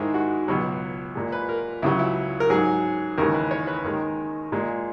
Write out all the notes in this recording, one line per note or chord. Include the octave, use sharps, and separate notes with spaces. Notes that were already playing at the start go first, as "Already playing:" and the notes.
Already playing: G#2 D#3 G#3 E4
F#4
C#2 B2 F#3
A#2 G#3
B4
A#4
C#2 C#3 F#3 E4
E4
A#4
G#2 F#3 G#4
D#2 C#3 E3 G#3 A#4
B4
C#5
B4
D#2 D#3 G#3 A#4
A#2 G#3